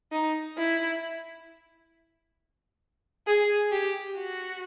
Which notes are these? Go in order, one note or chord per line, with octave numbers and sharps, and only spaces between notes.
D#4
E4
G#4
G4
F#4